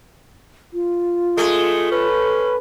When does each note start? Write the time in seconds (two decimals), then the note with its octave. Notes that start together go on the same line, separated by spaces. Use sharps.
0.73 F4
1.37 G#3 A3
1.91 C#4 B4